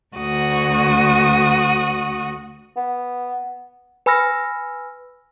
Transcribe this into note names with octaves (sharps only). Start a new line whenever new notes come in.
D2 F#4 D#6
B3
B4 G#5 B5 E6 F6 A#6